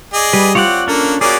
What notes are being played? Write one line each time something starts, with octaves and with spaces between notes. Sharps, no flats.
G#4 D5 D#5
G3 B4
C4 F4 C#5 D5 F#5
A#3 C#4 D4 A4
A#3 C#4 F#4 G#4 D5